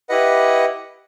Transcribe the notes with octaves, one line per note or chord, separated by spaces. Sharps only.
E4 G4 B4 D#5 F#5